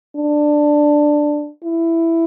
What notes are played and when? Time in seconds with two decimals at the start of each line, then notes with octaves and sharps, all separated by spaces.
0.16 D4
1.64 E4